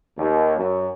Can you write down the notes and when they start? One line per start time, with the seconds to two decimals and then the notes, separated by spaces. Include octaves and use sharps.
0.17 D#2
0.57 F#2